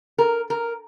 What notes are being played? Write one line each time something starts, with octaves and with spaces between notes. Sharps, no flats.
A#4
A#4